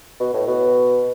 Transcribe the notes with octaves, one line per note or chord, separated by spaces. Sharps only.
B2
A2
B2